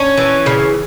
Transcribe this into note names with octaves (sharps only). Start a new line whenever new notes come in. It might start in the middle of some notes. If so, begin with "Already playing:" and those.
Already playing: C#4
E3
C#3